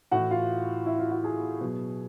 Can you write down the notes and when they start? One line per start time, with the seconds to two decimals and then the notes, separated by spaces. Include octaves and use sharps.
0.11 A2 E3 F#4 F#5
0.31 F4 F5
0.86 E4 E5
0.99 F4 F5
1.11 F#4 F#5
1.24 G#4 G#5
1.61 B2 F#3